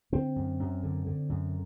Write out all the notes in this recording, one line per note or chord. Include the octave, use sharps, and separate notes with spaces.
D3 C4
F#2
F#2
D3
D3
F#2